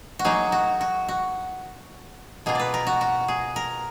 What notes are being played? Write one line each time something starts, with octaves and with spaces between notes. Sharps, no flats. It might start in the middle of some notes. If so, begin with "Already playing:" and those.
F#4
F#3 A#3 D#4 G#4
F#4
F#4
F#4
B2 A#3 F4 G#4
B4 D5
A#4
F#4
F#4
G#4
A#4